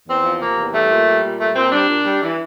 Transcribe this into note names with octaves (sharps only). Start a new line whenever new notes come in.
E2 C4
F3
C3 A#3
E2
G3 A3
A#2
G3
A#2
G3 A3
A#2 C4
G3 D4
A#2
G3
E3